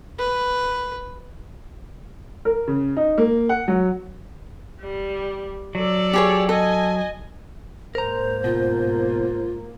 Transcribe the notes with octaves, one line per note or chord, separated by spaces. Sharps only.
B4
A#4
C#3
D#4
A#3
F#5
F#3
G3
F#3 A4 D5
G4 G#4 C#5
A4 D#5 G#5
G#2 A#3 A#4 C5 A#5
B2 F4